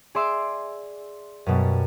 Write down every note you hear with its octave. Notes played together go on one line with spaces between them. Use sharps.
G#4 D5 E5 C6 D6 E6
F#2 B2 G3